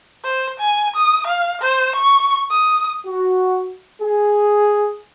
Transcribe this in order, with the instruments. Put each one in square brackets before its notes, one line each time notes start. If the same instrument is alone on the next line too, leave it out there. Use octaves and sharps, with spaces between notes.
[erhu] C5
G#5
D#6
F5
C5
C#6
D#6
[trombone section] F#4
G#4